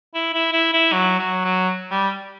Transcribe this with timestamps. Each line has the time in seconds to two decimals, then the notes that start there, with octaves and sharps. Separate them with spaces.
0.15 E4
0.34 E4
0.53 E4
0.74 E4
0.92 F#3
1.19 F#3
1.45 F#3
1.91 G3